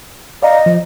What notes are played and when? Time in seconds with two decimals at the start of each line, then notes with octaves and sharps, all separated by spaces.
0.43 D5 D#5 F5 A#5
0.66 F3